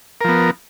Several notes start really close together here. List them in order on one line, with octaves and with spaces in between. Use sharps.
A#4 F3 B3